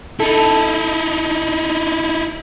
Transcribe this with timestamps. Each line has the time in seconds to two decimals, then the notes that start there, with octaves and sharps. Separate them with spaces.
0.20 D#4 E4 A4